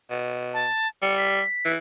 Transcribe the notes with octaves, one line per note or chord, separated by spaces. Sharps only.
B2
A5
G3 C#7
B6
E3